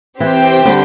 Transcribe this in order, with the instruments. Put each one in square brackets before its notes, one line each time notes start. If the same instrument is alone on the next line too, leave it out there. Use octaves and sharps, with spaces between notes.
[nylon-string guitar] E3 [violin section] C4 G4 C5 G5
[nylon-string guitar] D3 G3